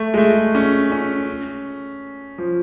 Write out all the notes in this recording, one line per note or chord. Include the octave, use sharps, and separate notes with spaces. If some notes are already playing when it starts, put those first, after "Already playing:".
Already playing: A3
G#3
A3
C#4
C#4
F3